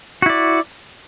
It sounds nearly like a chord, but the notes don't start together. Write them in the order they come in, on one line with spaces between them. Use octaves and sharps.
F#4 E4 D5